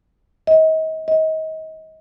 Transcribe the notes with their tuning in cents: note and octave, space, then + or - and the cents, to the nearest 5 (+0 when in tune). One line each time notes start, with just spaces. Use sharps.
D#5 +35
D#5 +30